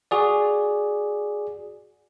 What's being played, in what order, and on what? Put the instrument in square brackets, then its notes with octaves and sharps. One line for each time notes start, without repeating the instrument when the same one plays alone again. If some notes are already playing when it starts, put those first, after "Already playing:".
[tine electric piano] F#4 G#4 D5